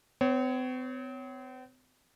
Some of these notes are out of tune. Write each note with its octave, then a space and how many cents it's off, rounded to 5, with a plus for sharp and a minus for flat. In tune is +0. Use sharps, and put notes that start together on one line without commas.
C4 -45 C#5 +0